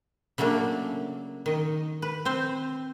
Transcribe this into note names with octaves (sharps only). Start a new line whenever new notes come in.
C#3 F#3 A3 A#3 D4
D#3 D#5
B4
C4 C5